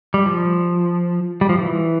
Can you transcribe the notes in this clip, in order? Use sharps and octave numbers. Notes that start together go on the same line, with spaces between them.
G3
F3
G3
F3
E3